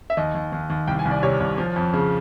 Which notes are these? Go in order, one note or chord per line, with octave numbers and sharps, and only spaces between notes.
E5
D#2 D#5
D#2
D#2
D#2
C2 G5
G#5
C2
D5
C3 C#5
C2
F3
F2
C#3